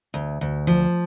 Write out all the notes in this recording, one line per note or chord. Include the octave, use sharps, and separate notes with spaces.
D2
D2
F3